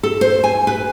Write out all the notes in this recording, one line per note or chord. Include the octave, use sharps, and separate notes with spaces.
A4
C5
G#5
B4